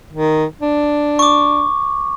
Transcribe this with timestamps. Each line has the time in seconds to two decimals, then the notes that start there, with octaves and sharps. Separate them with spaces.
0.13 D#3
0.61 D4
1.19 C#6 D6